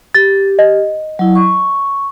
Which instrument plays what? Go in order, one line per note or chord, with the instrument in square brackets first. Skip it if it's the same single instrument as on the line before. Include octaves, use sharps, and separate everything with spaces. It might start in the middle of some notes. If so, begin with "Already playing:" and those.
[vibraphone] G4 [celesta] A6
[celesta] D#5
[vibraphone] F#3 E4
C#6